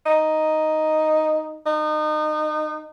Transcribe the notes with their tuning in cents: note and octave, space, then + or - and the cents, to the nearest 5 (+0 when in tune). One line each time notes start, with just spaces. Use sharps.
D#4 +0
D#4 -30